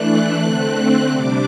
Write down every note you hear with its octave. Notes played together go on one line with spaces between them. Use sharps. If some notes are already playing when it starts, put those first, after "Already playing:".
Already playing: E3 A3 D4 F#6
D3 A3 C4
C3 G3 D4 D6